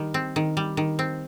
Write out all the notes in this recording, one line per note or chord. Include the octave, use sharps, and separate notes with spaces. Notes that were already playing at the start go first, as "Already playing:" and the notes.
Already playing: D#3 G3
C4
D#3
G3
D#3
C4